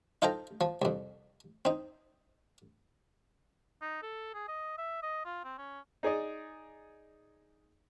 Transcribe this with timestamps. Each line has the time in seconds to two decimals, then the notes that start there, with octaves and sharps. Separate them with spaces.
0.22 D#4 F4 A4 C5 G5 A#5
0.61 F3
0.82 C2 F2
1.65 C4 D#4
3.82 D#4
4.03 A4
4.34 G#4
4.48 D#5
4.78 E5
5.03 D#5
5.25 F4
5.44 C4
5.58 C#4
6.03 D#4 G#4 D5 D#5